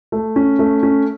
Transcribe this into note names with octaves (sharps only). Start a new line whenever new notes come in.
A3
C#4
A3
C#4